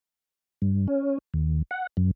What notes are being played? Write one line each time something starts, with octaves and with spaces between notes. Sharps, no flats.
G2
C#4
D#2
F#5
F#2